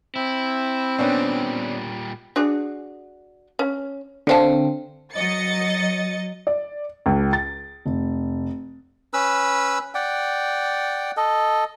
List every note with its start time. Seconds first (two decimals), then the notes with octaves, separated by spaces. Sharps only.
0.16 C4 E4
0.99 A#2 G3 B3 C#4 D4
2.36 D4 F#4 G#4
3.59 C#4
4.27 D3 C4 G4 F5 A5
5.13 F#3 D#5 A6 C#7
6.47 D5
7.06 C#2
7.33 A6
7.85 F1
9.14 C#4 B4 B5 E6
9.95 D5 F#5 G5
11.17 A4 D#5